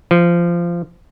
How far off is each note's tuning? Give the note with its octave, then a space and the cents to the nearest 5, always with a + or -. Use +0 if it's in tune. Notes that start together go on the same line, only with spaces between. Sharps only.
F3 -20